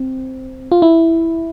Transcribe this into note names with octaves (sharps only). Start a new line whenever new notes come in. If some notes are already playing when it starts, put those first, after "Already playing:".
Already playing: C4
F4
E4